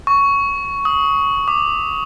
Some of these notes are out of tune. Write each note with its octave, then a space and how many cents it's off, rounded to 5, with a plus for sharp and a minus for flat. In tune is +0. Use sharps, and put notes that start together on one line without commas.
C#6 +10
D#6 +25
D6 +15